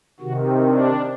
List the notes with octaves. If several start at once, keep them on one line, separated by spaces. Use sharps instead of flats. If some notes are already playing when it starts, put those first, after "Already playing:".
C3 D#3 F#4
D4